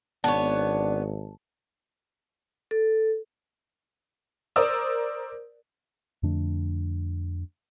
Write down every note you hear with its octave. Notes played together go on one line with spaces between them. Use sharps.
G#1 B3 D4 C#5 A5
A4
A#4 C5 D5 D#6 E6
F2 D3 A3 D4